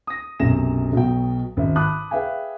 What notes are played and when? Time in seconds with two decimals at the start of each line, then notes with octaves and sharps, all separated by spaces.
0.07 D#6 A#6
0.40 B1 F#2 C3 A#6 E7
0.93 B1 B2 F#3 G5
1.57 G#1 C#3 E5
1.76 A5 B5 D6 D#6 F#6
2.11 G#4 B4 E5 F5 G5 G#5